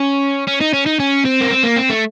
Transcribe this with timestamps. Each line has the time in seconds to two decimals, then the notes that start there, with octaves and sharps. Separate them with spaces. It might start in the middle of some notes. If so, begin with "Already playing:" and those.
Already playing: C#4
0.48 C#4
0.61 D#4
0.74 C#4
0.86 D#4
1.00 C#4
1.25 C4
1.40 A#3
1.50 C4
1.63 A#3
1.76 C4
1.90 A3